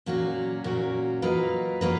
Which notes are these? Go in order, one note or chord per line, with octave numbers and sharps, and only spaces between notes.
A#2 F#3 A#3 C#4 F#4
A#2 F#3 A#3 C#4 F#4
F#3 A#3 F4 B4 D#5
F#3 A#3 F4 B4 D#5